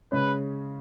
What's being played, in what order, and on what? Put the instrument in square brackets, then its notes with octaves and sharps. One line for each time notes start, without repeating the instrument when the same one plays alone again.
[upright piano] C#3 G#3 C#4 [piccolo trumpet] B4